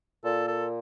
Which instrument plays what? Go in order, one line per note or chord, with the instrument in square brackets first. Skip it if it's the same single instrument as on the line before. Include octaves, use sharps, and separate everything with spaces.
[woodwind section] A#2 [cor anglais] A4
[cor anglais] A4